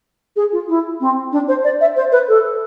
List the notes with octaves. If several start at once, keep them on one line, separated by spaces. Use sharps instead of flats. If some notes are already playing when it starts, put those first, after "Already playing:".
G#4
F4
E4
C4
D4
C5
D5
E5
C5
B4
A4